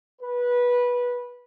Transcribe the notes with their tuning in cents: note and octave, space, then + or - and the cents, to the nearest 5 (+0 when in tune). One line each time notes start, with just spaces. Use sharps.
B4 -15